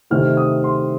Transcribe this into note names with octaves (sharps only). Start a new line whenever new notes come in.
C3 D#3 A3 C4 F6
D#6
C6